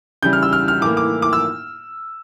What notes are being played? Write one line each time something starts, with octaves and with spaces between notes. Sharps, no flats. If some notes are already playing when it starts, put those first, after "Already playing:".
C#3 E3 G3 G6
F6
E6
F6
F6
A2 E3 A#3 D6
D6
D6
E6